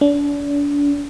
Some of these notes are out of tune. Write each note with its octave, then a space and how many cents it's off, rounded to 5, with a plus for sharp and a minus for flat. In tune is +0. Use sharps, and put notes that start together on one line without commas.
D4 -35